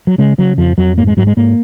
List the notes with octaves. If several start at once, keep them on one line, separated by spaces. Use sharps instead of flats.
F#3
C#3 G#3
C#3 F#3
F2 F3
F2 F#3
G#2 A#3
G#3
G#2 F#3
G#3
G#2 A#3